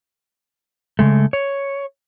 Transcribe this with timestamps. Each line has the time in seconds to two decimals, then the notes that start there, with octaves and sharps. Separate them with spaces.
0.99 C#3 G#3 A3
1.33 C#5